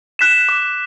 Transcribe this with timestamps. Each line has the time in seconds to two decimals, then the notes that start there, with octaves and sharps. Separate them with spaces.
0.19 F#6 B6 E7
0.49 D6